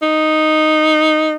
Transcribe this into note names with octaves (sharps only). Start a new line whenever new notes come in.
D#4